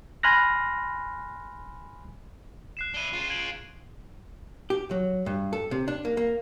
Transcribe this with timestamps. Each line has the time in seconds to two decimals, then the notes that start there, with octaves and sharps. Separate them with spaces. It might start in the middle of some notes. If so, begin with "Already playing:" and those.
0.23 G#5 B5 C6 F6 F#6 A#6
2.77 F#6 C7 E7
2.94 D4 E4 D#7 G7
3.13 C#3 F4
3.30 G#6 D7 F#7
4.70 G4
4.91 F#3
5.26 G2
5.53 A4
5.71 C3
5.88 D4
6.05 A#3
6.17 A#3